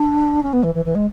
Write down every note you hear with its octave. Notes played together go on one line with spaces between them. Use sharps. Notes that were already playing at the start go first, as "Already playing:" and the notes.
Already playing: D4
C#4
B3
E3
E3
E3
G#3